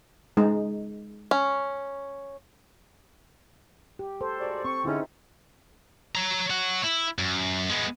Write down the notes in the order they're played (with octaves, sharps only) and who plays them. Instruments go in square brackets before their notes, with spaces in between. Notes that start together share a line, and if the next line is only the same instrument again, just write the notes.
[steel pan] G#3 D#4
[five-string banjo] C#4
[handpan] G4
A4 C5
[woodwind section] G#2 F#4 D5
[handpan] C4 [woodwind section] C#6
[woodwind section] G#2 D3 C#4 [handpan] D#4 E4
[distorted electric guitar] C#5 A#5
C#5 F#5
E4
F#2
G#3 B3